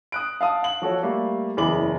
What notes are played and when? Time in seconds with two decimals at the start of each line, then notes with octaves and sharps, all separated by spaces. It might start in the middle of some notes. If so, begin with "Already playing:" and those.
0.12 D#6 F#6 D7
0.41 F5 A5 D#6
0.63 F5 F#7
0.82 F3 F#4 A4 C#5
1.03 G3 A3 A#3
1.57 F#1 E2 G#4 B5 D6 F#7